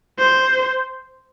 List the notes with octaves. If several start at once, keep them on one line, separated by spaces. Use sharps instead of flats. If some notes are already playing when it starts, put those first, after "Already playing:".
C5